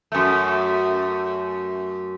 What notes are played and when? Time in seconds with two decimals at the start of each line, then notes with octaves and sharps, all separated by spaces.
0.12 F#2 A3